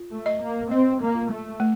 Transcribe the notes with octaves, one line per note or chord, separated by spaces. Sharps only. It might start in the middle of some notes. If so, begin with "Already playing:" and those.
Already playing: F4
A3
D#5
A#3
C4 D#5
A#3
F4
A3
A3